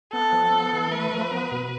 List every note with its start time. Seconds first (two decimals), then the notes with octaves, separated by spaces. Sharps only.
0.13 B3 A4
0.33 F3
0.53 B3
0.73 E3
0.92 A3 B4
1.11 F3
1.31 B3
1.52 B2